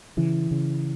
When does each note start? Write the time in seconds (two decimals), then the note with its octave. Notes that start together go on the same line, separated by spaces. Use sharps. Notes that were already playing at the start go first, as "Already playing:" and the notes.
0.17 C#3 E3
0.51 C#3